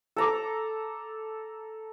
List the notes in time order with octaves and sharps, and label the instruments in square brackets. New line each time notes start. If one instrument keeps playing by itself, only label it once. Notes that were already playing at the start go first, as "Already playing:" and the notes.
[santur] A4 A#5 D6